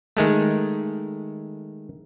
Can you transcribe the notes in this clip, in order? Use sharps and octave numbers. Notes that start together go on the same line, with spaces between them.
D#3 G#3 A3